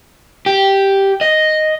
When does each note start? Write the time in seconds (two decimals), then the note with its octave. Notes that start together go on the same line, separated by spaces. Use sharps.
0.46 G4
1.21 D#5